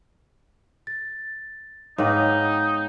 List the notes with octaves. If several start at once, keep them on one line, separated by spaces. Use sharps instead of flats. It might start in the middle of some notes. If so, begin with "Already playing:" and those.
A6
G#2 B3 D#4 B4 C#5 F5 G5